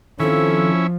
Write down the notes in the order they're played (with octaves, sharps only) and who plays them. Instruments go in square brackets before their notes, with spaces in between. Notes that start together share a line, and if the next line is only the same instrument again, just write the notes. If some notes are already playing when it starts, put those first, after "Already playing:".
[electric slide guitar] D#3 C4 [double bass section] F3 [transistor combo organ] C#4 E4 [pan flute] A4